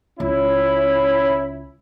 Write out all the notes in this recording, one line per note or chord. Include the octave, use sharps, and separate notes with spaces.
C#2 C#4 E4